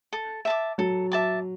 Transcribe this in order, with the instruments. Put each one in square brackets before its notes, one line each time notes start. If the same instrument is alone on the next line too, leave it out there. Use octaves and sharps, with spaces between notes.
[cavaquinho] A4
E5 A5 D6
[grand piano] F#3 [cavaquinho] A4
[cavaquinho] E5 A5 D6